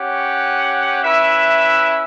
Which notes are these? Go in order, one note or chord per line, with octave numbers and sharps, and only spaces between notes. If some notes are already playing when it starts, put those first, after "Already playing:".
Already playing: C#4 G4 C#5 F#5
C#4 E4 B4 E5